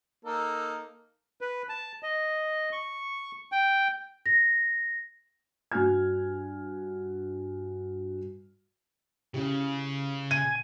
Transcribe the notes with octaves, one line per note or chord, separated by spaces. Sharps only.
A#3 D#4 A4
B4
A5
D#5
C#6
G5
A#6
G2 F#4 G#5 F6 G#6
C#3 C#4 E4 G4
A#2 G#5 D#7